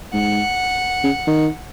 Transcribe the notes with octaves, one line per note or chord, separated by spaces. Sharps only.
G#2 F#5
C#3
D#3